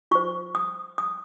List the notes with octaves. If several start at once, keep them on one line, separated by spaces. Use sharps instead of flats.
F4 C5 C#6
D#6
D#6